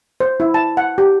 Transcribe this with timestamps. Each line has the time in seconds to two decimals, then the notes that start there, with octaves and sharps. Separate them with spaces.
0.20 C5
0.40 E4
0.54 A5
0.77 F#5
0.98 G4